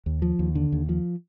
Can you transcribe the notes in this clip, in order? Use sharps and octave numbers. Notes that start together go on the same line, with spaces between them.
D#2
F3
D#2
D3
D#2
F3